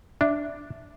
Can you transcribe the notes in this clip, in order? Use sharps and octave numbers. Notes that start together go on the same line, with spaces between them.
D4 E5